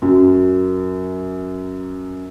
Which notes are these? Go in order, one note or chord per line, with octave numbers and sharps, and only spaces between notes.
F#2 F#3